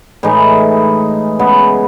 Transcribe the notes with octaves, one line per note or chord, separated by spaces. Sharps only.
A2 E3 G#3 D#4
C#3 G#3 B3 E4